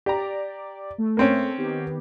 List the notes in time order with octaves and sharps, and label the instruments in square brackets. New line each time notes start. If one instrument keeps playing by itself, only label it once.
[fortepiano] G4 A#5 [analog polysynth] D5
[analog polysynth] A3
[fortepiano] A#3 C4 C#4
[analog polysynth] D#3 B3 G4